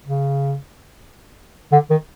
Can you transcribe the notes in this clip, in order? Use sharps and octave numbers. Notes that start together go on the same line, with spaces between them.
C#3
D3
D#3